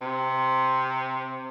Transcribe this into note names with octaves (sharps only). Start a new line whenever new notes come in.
C3